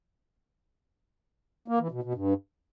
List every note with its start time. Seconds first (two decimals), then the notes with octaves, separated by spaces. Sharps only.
1.68 A#3
1.80 E3
1.91 B2
2.03 B2
2.15 G2